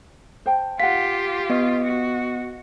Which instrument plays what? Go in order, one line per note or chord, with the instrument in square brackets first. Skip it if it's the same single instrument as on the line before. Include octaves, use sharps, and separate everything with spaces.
[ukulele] C5 G5 A5
[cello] F4 G4 [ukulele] F5 F#5 [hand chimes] B6
[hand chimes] B3 D#5
[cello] F#4